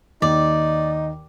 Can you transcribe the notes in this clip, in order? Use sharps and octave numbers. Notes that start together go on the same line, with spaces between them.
D#2 D#4 D5